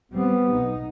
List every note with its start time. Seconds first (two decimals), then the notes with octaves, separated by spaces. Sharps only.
0.12 G3 B3 C4
0.52 B1 D#4